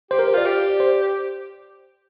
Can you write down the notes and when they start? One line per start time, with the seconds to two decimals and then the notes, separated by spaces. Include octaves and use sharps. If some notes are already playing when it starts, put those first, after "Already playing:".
0.11 G4 C5
0.19 A#4
0.28 C5
0.34 F4 D5
0.46 G4
0.80 C5